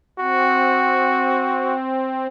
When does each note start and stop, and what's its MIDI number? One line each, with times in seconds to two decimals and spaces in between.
0.19 2.27 60
0.19 1.75 66